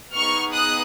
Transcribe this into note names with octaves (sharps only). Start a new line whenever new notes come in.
B3 D#4 G#4 C#6 F6
D#6 F#6